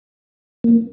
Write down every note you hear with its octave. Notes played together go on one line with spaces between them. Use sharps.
A#3